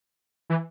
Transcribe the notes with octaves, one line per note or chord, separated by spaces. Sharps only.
E3